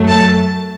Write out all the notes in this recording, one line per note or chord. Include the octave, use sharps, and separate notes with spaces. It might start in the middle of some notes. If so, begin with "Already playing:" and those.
Already playing: F#2 F#3 A3
A5